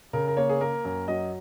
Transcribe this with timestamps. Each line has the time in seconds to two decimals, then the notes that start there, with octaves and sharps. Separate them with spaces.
0.13 C#3 A#4
0.28 A#4
0.37 A#3 C#5
0.49 G#4
0.61 A#3 A#4
0.85 F#2
1.08 F#3 D#5